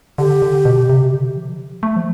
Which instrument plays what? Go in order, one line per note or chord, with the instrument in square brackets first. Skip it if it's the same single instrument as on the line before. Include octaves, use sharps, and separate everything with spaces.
[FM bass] D3 [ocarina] G4
[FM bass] D3
B2
C3
D3
F3
A3
F3